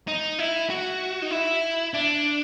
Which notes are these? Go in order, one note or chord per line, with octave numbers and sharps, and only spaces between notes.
D#4
E4
F#4
D#4
E4
D4